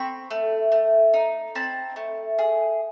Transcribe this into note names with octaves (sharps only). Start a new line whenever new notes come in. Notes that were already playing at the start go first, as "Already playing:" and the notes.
Already playing: C4 B5 C#6
A3
A3
D#4
C4 A5 B5
A3
G#4